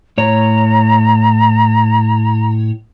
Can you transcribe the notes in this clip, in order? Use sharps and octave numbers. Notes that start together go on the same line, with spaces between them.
A2 C#5 A#5